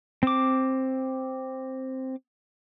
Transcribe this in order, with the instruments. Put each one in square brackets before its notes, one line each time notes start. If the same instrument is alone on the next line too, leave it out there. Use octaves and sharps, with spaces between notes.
[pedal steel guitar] C4 D6